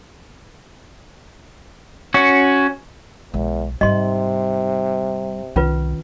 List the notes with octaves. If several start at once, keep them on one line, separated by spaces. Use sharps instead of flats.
C#4 F#4
B1 E2 G#3
G#2 C3 G3 D#4 D#5 C6
C2 D#3 C#4 F4 B4